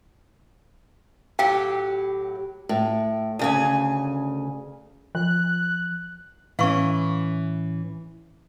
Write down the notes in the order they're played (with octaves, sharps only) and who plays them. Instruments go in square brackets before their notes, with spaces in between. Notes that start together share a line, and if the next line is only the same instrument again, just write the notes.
[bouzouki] A2 F#3 G4 [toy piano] F5 G5
[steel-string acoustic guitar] A2
D2 C#3 G#5
[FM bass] F3 [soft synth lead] F#6
[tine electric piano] A2 [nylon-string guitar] E3 C#4 [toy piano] F5 C#6